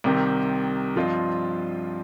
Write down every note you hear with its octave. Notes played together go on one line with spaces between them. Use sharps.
C2 C3 D#3 C4 G4
G2 F3 C4 F4 D#5